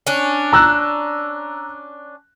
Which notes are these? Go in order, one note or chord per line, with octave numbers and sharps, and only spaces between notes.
C#4 D4
A#5 E6 F#6